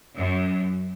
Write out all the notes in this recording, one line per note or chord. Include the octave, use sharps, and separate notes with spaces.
F#2